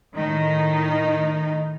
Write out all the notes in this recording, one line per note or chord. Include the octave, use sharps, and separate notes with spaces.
A2 D#3 D#4